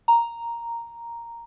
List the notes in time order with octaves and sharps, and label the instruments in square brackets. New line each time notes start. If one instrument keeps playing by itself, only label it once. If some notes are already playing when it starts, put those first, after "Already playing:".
[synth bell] A#5